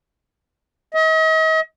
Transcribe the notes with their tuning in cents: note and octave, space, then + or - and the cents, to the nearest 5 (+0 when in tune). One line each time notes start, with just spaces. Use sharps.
D#5 +40